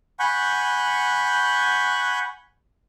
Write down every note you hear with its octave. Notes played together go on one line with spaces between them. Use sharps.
F#5 G#5 B5 C#6 F#6 G6